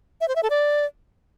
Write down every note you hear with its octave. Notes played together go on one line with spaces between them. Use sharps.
E5
C5
E5
A4
D5